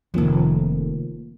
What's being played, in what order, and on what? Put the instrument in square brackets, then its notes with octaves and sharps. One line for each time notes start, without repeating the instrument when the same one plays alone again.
[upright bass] F1 F2 [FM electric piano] D#3 F3 A#3